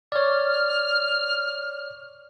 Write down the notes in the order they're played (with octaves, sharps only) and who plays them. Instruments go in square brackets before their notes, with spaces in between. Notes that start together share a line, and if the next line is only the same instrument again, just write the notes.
[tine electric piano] C#5 D5 [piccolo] F6